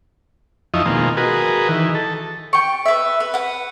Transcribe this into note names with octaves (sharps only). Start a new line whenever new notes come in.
F2 F3 D#4 E4 D#5 C#6
B2 D#3 G#3 A#3 C4 F4
F#4 G#4 A#4 B4 D#5
D#3 E3
A4
G4 C#6
B4 E5
B4
B4 F#5